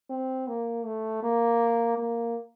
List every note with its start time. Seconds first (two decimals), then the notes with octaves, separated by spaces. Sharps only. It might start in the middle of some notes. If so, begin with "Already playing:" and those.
0.10 C4
0.48 A#3
0.86 A3
1.23 A#3
1.98 A#3